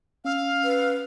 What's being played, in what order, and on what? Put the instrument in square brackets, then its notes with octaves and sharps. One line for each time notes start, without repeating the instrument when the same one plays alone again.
[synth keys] C#4 E6 [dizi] F5
[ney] B4